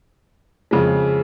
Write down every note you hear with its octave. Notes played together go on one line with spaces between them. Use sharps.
F2 C#3 G#3